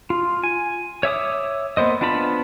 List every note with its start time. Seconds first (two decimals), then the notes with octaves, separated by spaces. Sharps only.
0.10 F4
0.44 G#5
1.03 C#5 E5 D6 D#6
1.77 A#3 B3 C5 D#5
2.01 B3 D4 F4 A5 B5